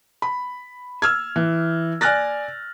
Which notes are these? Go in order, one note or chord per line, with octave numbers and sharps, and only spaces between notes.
B5
E6 F6 G#6
E3
D5 G#5 F6 F#6 A6 A#6